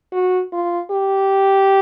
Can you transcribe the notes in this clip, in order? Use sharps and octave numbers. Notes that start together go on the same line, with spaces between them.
F#4
F4
G4